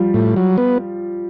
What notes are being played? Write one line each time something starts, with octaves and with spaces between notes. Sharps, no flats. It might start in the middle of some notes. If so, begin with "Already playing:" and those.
Already playing: F3 G3
A2
F#3
B3